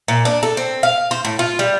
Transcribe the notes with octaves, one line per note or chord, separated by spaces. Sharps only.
A#2
D4
A4
C4
F5
C5
A2
F4
G3